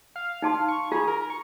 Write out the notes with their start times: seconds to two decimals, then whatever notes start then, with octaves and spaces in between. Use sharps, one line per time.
0.16 F5
0.42 D#4 A5 C6
0.68 C#6
0.92 F4 G#4 B5
1.08 A#4
1.30 C#6